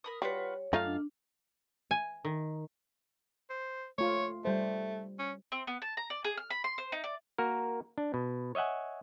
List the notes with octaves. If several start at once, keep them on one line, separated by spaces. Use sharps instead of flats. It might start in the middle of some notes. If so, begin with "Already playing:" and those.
A#4 B5 D#6
G3 F4 F#4 B4 C#5
F#2 A3 D#4 F4 F5 F6
D4
G#5
D#3
C5
A3 F4 C#5
G3 A3 C5
C#4
C4
B3
A5
A#5
D5
G#4
F6
B5
C6
C5
D#4
D5
A#3 F#4 A#4
D4
B2
C#5 D#5 E5 F#5 G#5